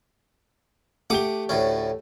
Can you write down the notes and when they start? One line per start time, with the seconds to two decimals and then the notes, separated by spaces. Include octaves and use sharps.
1.10 A3 G4 F#5 D6 D#6 G7
1.49 D2 A2 C#4